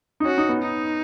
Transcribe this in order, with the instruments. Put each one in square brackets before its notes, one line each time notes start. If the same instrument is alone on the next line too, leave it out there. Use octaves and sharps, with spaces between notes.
[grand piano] D#4
[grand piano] C#4 [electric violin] F#4
[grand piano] D#4
B3
[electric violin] D#4